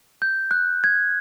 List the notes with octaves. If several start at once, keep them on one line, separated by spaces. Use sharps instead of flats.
G6
F#6
G#6